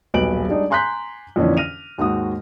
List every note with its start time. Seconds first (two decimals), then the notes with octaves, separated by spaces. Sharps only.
0.14 D#1 B1 B4 D7 F#7
0.48 G3 G#3 D4 D#4
0.70 G#5 A#5 C6 F#6 G6 B6
1.36 F2 A#2 D3 E3 C#4 D4
1.57 F6 A#6 D#7 F7
1.98 D#2 G#2 F#4 D#6